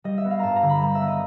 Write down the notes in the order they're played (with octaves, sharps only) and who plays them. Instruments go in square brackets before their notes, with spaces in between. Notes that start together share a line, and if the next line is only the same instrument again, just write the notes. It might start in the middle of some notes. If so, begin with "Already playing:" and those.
[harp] G3 D#5
E5
B3
F5
G2 A5 A#5
A#5
D3
B5
G3 A#5
E5
B3
D#5